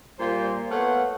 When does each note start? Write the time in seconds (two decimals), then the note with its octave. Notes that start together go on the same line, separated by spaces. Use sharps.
0.19 A#2 G3 F4 C5
0.71 A3 B3 C#5 F5 F#5